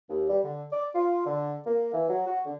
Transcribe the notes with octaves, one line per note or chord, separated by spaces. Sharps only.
D#2
G3
D3
D5
F4
D3
A#3
E3
F#3
F#4
D3